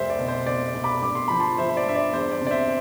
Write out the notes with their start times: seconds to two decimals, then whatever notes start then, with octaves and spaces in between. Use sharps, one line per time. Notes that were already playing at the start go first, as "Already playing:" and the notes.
Already playing: F1 C2 C5 E5
0.10 D5
0.19 B2
0.28 C5
0.46 B2 D5
0.74 C2
0.84 B5 D6
1.02 G1 D6
1.15 C6
1.28 F3 B5
1.40 A5 C6
1.58 F3 C5 E5
1.69 C5
1.77 D5
1.86 G2 E5
1.95 D5
2.13 E2 C5
2.32 D5
2.41 C3
2.47 D5
2.51 C5 E5